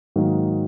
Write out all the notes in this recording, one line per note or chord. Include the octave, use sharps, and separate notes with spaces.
G#2 D#3 F#3 A#3 D#4